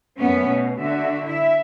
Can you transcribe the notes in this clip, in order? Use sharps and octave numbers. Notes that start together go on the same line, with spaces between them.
F#2 A3 B3 C#4
B2
D3 F#4 E5
E4 E5